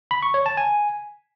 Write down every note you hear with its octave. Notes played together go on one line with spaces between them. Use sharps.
B5
C#6
C#5
A5
G#5